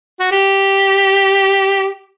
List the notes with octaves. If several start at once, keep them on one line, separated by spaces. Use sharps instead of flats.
F#4
G4